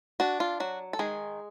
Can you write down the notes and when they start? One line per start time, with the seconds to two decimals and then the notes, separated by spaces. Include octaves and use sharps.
0.20 D4 F#4
0.40 F4
0.60 F#3 F#4
0.93 A4
0.99 D#3 G#3 G#4